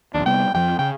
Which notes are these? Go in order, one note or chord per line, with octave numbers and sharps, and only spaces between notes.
A#1 D#2 D4
C3 G3 B3 G5
F2 F3 G5
C#3 G5